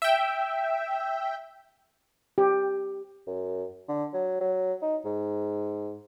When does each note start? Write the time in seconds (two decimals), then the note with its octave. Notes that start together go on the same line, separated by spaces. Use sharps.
0.02 E5 G5
2.38 G4
3.27 F#2
3.89 D3
4.14 F#3
4.41 F#3
4.82 D#4
5.05 G#2